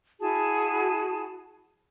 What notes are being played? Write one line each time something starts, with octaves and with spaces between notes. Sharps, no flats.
E4 F#4 G#4 A5